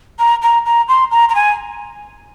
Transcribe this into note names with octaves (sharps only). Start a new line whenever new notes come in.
A#5
A#5
A#5
C6
A#5
A#5
G#5